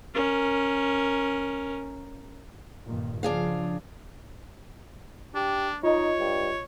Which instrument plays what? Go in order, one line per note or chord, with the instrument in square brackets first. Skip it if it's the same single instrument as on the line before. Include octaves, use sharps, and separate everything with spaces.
[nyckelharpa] C#4 A#4
[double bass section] G2 A#2 D#3
[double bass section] C#3 F3 [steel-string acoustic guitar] D4 G#4 F5
[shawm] D4 [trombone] G4
[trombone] D#4 [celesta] F4 D#5 [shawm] C#5
[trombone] G2